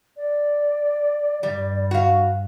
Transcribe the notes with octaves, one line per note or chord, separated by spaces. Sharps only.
D5
G2 G3
F#4 F5